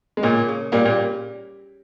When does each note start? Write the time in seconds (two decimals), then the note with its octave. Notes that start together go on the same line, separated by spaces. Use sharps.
0.17 G#3
0.23 A#2 C#3 A#3
0.48 C#3
0.72 A#2 G3 A#3
0.84 A#2 A#3